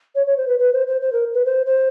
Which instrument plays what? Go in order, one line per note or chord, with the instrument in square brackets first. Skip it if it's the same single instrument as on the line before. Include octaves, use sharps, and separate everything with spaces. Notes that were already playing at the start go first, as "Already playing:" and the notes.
[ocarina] C#5
C#5
C5
B4
B4
C5
C5
C5
A#4
B4
C5
C5